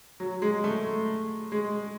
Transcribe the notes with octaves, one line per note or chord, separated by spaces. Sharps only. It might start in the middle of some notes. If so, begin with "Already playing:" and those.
F#3
G#3
A3
G#3